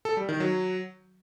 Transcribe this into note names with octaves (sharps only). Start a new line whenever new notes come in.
A4
G3
D#3
F#3